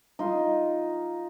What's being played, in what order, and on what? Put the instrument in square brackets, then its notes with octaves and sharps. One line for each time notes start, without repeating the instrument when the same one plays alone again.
[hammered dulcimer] D#4 F4 C6